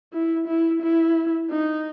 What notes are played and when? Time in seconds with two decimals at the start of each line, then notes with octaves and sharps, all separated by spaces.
0.13 E4
0.48 E4
0.82 E4
1.51 D#4